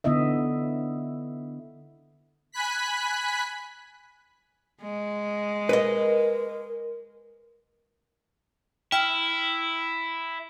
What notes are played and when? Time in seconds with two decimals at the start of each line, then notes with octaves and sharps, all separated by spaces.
0.04 D3 B3 E4 D#5 E5
2.52 G#5 B5 F#6 B6
4.82 G#3
5.69 A#4 B4 D#5
8.92 E4 G5 F6